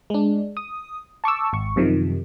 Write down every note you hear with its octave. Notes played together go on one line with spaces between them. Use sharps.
G#3 D4
D#6
A5 C#6 D6 E6
G#1 C#6
F#2 C3 D#3 F3